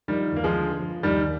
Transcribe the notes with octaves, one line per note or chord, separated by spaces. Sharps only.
D#3 F3 G3
D#2 A#3
F3 G#3
D3
F3
D#2 D#3 G3